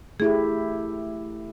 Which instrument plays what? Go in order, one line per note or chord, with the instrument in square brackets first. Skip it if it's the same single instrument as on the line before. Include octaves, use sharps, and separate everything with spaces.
[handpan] A3 E4 G4 [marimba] G#4